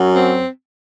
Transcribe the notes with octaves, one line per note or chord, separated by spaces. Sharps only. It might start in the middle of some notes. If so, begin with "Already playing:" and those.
Already playing: F#2 F#3
C4